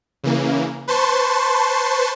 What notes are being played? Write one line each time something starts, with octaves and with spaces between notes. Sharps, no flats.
C#3 E3 A#3
B4 C5 A5 C6 C#6